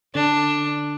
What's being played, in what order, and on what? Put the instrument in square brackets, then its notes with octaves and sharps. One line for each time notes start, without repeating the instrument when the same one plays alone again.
[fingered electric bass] D3 [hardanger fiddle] D4